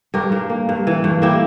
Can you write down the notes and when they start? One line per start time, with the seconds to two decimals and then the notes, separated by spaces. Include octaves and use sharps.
0.14 G2 G4 A#4
0.32 G2
0.50 A#3
0.69 G2
0.87 E3
1.04 G2
1.22 A#3 E4 G4